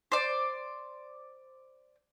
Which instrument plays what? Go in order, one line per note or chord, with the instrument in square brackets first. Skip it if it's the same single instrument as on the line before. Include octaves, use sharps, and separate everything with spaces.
[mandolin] C5 D5